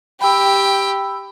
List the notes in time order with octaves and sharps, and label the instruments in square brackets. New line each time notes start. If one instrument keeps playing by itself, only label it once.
[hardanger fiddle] G4 G5 [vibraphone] B5 E6